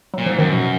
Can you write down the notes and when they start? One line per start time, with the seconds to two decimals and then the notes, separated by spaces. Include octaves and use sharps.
0.14 A#2 F#3
0.26 G#2 F3
0.39 F#2 D#3
0.53 B2